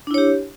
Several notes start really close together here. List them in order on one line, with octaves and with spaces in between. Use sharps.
D4 E4 C#5 G4